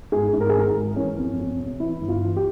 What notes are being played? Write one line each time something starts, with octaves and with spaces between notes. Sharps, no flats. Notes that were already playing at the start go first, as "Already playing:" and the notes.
G#2 G#4
G#2
A#4
G#4
G#1 A#4
A#4
G#3
E3 C#4
F2
F2
C3
E3 E4
G1
F4
E3
G4